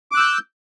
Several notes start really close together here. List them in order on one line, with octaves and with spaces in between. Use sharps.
D6 F#6 E6 G6